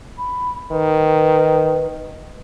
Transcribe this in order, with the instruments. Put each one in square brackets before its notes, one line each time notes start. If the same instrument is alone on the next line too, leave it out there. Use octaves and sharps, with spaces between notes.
[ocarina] B5
[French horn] D#3 [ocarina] B4